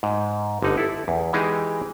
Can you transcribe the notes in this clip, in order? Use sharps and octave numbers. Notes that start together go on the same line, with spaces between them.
G#2
G1 D3 D#4 F#5
E4 A4
E2
E3 G#3 D#4 G4 G#4